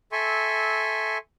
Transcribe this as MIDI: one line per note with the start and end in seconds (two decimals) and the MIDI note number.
0.12 1.18 69
0.12 1.18 76
0.12 1.18 80
0.12 1.18 84
0.12 1.18 85